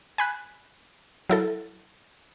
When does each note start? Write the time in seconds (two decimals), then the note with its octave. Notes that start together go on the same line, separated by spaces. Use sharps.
0.18 G#5 B5 F#6
1.29 F#3 E4 A4